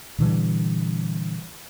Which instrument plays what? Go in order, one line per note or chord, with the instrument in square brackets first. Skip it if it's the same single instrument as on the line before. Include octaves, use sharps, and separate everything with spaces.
[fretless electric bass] A#2 D3 E3 G3